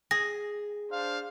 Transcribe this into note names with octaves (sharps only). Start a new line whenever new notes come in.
G#4 A#6
D4 C5 F5